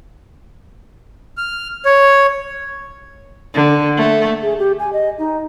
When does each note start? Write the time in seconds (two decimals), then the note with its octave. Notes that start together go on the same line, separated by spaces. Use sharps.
1.37 F6
1.85 C#5
3.54 D3
3.97 A3
4.42 G#4
4.59 G4
4.79 G#5
4.93 D#5
5.19 D#4